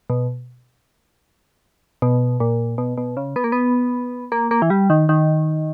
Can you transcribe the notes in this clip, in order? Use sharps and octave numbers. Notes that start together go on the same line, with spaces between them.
B2
B2
A#2
B2
B2
C#3
B3
A#3
B3
A#3
A#3
E3
G3
D#3
D#3